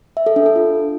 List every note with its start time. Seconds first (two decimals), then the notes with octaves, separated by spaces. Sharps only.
0.17 E5
0.26 A4
0.36 D4
0.46 A4
0.56 F4